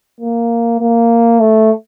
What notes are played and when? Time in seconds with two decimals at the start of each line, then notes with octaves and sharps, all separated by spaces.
0.21 A#3
0.80 A#3
1.40 A3